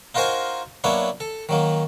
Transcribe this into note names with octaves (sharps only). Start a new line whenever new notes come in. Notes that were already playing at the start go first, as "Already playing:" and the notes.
D#4 F4 F#4 A#4 C5 G#5
F#3 A#3 B3 D4 E4 C#5
A4
D#3 F#3 A#3